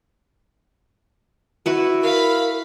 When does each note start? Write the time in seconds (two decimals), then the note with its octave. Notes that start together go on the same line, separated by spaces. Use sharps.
1.66 E4 F#4 B4
2.03 A#4 F5 B5